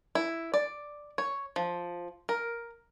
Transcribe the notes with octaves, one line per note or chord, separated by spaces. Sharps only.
E4
D5
C#5
F3
A#4